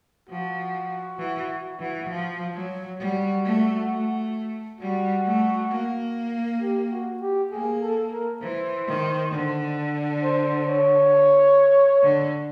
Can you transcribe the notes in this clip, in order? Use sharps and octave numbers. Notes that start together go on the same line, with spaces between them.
F3 F#4
E3
E3
F3
F#3
G3 F#4
A3
A3
G3 F#4
A3
A#3
G4
F#4
G4
A#3 G#4
A4
A#4
E3 C5
D#3
D3
C5
C#5
D3